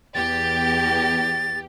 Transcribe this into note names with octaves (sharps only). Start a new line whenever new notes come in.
E2 G4 A6